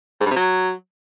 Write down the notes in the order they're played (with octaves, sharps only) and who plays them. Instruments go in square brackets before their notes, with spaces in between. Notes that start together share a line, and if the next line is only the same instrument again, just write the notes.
[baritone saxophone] G#2
G2
C3
F#3